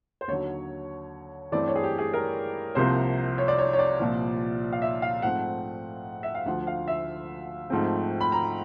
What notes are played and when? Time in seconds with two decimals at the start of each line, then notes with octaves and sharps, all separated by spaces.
0.21 C5
0.28 D#2 D3 F#3 C#5
1.52 G2 E3 A3 C4 D5
1.68 C#5
1.76 G#4
1.83 G4
1.99 G#4
2.14 A#4
2.75 C2 C3 F3 A#3 C5
3.38 C#5
3.48 D5
3.59 C#5
3.73 C#5
3.79 D5
3.99 C2 A#2 F3
4.72 F5
4.82 E5
5.02 F5
5.22 G#2 F3 A3 C4 F#5
6.23 E5
6.35 F5
6.46 D2 D3 F3 F#5
6.67 F5
6.88 E5
7.70 G#2 F3 A3 C4
8.21 B5
8.32 A#5